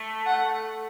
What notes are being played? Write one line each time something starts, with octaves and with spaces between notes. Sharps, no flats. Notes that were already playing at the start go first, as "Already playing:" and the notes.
Already playing: A3
F#5